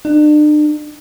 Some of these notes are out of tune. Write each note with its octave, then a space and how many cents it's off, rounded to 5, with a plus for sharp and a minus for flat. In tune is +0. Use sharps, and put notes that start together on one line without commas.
D4 +40